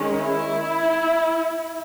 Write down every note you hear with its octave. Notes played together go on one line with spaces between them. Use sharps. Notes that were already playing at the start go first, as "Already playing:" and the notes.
Already playing: D#3 G#3 C#4
E4